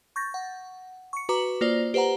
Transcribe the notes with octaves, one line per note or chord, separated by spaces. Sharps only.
C#6 G6 A6 A#6
F#5
C#6 C#7
F#4 B4 A#5 D6
A#3 F4 C5 D5
G4 B4 C5 F#5 A#5